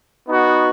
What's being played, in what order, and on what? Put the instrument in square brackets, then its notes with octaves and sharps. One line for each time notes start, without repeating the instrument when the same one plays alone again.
[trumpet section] B3 D#4 F#4